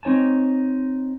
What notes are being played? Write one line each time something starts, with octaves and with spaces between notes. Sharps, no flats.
C4 D#4 C#5 G#5 A5